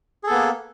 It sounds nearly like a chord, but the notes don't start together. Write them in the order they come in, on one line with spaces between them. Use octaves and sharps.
G#4 A4 B3 A#3